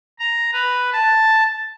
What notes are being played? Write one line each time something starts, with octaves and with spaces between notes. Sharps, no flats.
A#5
B4
A5